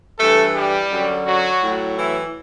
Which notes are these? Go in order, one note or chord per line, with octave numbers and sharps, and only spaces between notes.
G2 E3 A3 A4
G3 G4
F#2 D3 F#3
F#3 F#4
A2 F#3
E3 E4